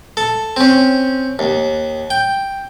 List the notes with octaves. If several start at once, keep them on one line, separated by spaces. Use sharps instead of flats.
A4
C4 C#4
D#2
G5